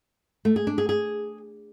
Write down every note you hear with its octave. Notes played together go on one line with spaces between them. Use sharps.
A3
G#4
D4
G#4
G#4